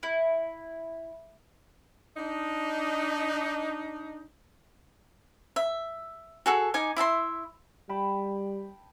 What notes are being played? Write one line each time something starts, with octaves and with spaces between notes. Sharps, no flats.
E4
D4 D#4
E5
F#4 G#4 A4
D#4 G#5 D6
E4 E5 A5 C6
G3 G5 A5 B5